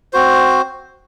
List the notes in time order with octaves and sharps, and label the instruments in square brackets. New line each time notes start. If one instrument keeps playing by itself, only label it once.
[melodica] C4 F#4 C5